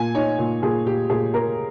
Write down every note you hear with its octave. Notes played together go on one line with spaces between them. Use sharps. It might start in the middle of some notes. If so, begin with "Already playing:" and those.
Already playing: A#2 G#5
D#4 C#5
A#2
A#2 G#4
A#2 G4
A#2 G#4
A#3 A#4